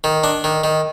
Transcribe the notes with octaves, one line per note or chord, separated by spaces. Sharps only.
D#3
D4
D#3
D#3